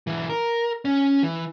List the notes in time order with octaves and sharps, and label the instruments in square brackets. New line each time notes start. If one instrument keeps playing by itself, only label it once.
[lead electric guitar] B1 E3
A#4
C#4
E3